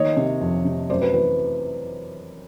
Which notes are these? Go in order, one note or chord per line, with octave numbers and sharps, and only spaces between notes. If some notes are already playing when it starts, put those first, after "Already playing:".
Already playing: D#3 A#3 C#5 D#5
C3
F2
C3
F#2 C5 D5
B4
E3 B4